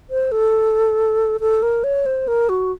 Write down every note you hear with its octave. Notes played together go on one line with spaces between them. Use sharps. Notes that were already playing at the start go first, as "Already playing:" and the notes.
C5
A4
A4
A#4
C#5
C5
A#4
F#4